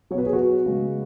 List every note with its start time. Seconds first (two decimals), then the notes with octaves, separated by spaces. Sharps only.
0.11 F#3 C#5
0.15 B2 B4
0.26 G#4
0.33 F#4 B4
0.66 C#3 G#3